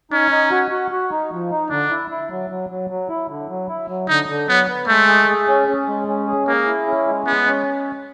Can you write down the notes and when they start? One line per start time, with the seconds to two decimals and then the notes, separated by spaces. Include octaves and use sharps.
0.11 C#4 D#4
0.31 D#4
0.51 F#4
0.71 F#4
0.91 F#4
1.11 D#4
1.31 F3
1.51 D#4
1.70 D3 D4
1.90 E4
2.11 E4
2.31 F#3
2.50 F#3
2.70 F#3
2.90 F#3
3.09 E4
3.29 D3
3.49 F#3
3.68 E4
3.88 F#3
4.08 D3 D#4
4.29 D3
4.49 F#3 B3
4.68 B3
4.88 G#3 A3
5.08 G#4
5.29 G#4
5.48 C#4
5.68 C#4
5.88 G#3
6.08 C#4
6.28 G#4
6.48 A#3 G#4
6.66 E4
6.87 C#4
7.07 G#3
7.27 G#3 B3
7.47 C#4